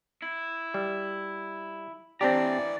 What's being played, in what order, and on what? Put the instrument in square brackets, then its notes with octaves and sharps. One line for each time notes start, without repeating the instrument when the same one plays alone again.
[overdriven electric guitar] E4
[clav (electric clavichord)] G3
[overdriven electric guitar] E3 A#5 [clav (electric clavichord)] C4 D4 G4 [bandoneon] D5